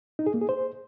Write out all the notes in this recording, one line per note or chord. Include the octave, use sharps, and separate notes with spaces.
D#4
G#4
A#3
G#4
C5